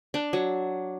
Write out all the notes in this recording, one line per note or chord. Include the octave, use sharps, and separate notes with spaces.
D4
F#3